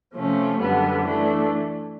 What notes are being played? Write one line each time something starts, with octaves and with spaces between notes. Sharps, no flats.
C3 F3 A3 C#4
F#2 D3 G3 B3
E3 A3 D4